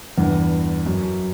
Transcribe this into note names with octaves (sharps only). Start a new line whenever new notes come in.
E2 G2
F#2